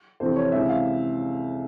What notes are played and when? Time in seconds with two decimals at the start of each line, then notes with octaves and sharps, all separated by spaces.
0.20 F2 C3 E3 C5
0.36 C#5
0.52 C#2 C3 E3 E5
0.69 F5